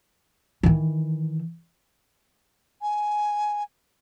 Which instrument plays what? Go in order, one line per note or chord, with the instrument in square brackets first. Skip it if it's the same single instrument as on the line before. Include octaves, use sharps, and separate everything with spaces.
[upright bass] D#3 E3
[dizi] G#5